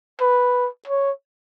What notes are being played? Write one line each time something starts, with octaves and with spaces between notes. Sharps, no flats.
B4
C#5